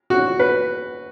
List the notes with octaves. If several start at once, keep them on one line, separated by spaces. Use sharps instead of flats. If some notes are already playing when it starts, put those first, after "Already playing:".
F#4
B4